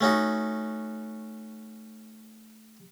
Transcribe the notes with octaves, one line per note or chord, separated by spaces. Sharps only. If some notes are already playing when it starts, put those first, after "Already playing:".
A3 C#4 D#4 F#4